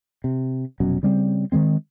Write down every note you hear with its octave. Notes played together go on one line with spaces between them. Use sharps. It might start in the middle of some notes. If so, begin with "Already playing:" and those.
C3
F1 B2 F#3 C#4
C#3 G3 C4
D#3 F3 G#3 C4